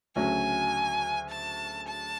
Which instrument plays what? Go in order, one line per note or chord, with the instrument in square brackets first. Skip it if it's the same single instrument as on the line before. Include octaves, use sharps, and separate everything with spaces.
[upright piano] D2 C#3 F#3 A3 C#4 [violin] G#5
[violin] A5
A5